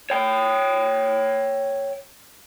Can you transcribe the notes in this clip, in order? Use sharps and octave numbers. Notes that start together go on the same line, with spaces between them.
C#5 G5